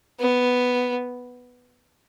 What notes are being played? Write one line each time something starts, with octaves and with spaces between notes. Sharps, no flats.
B3